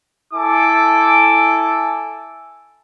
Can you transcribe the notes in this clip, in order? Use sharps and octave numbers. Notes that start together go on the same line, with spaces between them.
E4 A4 G#5 D6